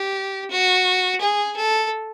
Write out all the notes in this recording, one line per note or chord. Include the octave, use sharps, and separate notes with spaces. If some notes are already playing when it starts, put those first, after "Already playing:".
Already playing: G4
F#4
G#4
A4